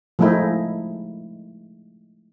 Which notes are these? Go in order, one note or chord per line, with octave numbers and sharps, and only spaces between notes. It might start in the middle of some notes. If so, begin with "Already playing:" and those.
F3 G#3 A3 D#4 E4